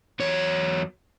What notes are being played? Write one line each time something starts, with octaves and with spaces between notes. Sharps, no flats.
E2 F#3 C#5